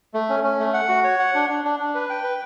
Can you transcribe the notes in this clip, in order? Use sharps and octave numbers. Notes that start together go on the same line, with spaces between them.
A3
C#4
C#4
A3
F#5
F#4
C#5
F#5
D4
D4
D4
D4
B4
G5
B4